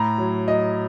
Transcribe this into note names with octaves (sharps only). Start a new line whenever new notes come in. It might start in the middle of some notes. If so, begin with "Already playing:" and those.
Already playing: A2 A#5
F#3
F#3 D#5